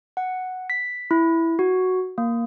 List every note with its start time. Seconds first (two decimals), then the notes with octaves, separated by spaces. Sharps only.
0.17 F#5
0.70 B6
1.11 E4
1.59 F#4
2.18 A#3